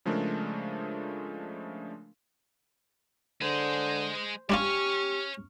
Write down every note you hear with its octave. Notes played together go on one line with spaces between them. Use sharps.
C#3 F3 G#3 A3 D4 A#4
D3 G#3 G#4 C5
G3 D4 F4 G4 C#5 G#5 C#6 F6